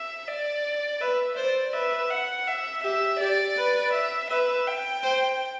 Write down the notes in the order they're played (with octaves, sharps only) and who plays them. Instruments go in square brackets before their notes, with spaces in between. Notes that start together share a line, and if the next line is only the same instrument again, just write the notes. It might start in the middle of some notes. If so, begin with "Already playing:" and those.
Already playing: [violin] E5
D5
[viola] B4 [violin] E5
[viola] C5 [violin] D5
[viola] B4 [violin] E5
[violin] F#5
E5
[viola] G4 [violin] E5
[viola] G4 [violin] D5
[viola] B4
[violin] E5
[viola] B4 [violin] E5
[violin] G5
[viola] C5